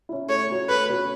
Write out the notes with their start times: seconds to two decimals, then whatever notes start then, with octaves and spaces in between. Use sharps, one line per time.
0.09 C#4 E4
0.29 A3 C#5
0.49 C#4 F#4 C#5
0.69 A3 B4
0.89 C#4 F#4 C#5